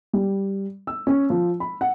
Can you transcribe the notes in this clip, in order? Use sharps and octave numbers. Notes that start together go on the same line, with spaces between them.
G3
E6
C#4
F3
B5
F#5